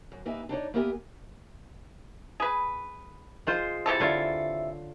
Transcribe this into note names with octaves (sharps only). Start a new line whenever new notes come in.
F#2
C3 A#3 D#4 B4 E5 G#5
D4 D#4 C#5 D5
A#3 B3 G4 A#4 E5 G#5
G#4 B4
G#3 F4 C5
C3 E3 A4
D3 F4 C#5